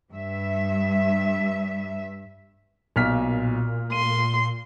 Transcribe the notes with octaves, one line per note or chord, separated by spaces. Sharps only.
G2 E5
B1 A#2 F6 B6
C6 D#7